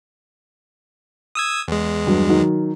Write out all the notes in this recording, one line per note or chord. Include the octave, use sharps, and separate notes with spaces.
D#6 E6 G#6
E2 G#3
G2 F#3
D#3 F#3